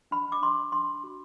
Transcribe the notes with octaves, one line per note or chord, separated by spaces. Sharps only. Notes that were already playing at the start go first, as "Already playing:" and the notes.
D4 B5
D6
D4 C6
D4 C6
F#4